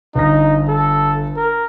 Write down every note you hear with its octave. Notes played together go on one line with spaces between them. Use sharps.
G1 D#4 A#6
A4
A#4